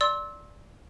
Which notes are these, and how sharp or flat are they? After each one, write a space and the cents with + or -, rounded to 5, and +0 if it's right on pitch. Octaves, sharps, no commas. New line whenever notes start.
D5 +0 C6 +25 E6 -20